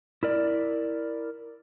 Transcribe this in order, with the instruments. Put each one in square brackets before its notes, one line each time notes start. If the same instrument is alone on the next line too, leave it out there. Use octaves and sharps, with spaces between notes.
[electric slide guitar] E4 A#4 D5